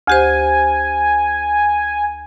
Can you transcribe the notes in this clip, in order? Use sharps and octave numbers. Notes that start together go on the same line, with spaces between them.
D2 G4 C5 G#5